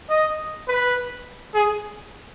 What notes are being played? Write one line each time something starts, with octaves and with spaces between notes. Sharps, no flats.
D#5
B4
G#4